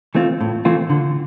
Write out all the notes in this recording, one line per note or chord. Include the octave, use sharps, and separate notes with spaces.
E3 A3 C4 F4
A2
E3 A3 C4 F4
D3